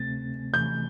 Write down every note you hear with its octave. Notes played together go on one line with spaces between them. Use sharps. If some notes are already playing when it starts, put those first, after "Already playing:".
Already playing: D2 C3 A3 C4 A6
C3 E3 A3 G6